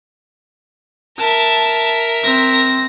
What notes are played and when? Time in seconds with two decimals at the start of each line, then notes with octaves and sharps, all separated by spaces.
1.18 A#4 E5 A5
2.23 C4 A#6